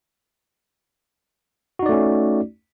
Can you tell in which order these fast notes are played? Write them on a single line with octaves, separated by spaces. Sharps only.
F#4 D#4 D5 A3 C#4